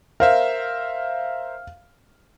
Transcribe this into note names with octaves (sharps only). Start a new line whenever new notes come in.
A#4 C5 E5 F5